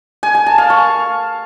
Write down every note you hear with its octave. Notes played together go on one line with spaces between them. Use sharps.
G#5
G#5
A5
F5
C#6